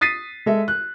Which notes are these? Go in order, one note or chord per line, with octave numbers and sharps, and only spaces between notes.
D#6 A6 B6 C7 D#7
G#3 A4 E5
F#6